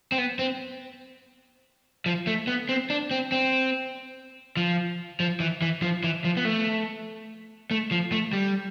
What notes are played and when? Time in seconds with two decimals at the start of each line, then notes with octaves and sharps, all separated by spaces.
0.12 C4
0.18 B3
0.39 C4
2.06 F3
2.27 A3
2.47 B3
2.69 C4
2.90 D4
3.11 C4
3.32 C4
4.57 F3
5.20 F3
5.40 E3
5.62 E3
5.82 F3
6.04 E3
6.24 F3
6.37 B3
6.45 A3
7.71 A3
7.91 F3
8.12 A3
8.33 G3